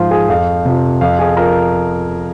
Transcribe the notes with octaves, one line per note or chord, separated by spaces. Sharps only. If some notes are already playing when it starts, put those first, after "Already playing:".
Already playing: G#2 F3 C5 F5 C6
G#4 G#5
F2 F5
C3 F3
F2 F5
G#4 G#5
F3 A#4 A#5